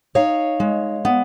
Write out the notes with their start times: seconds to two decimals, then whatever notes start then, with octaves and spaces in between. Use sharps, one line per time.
0.15 D#4 C#5 F5
0.60 G#3
1.05 B3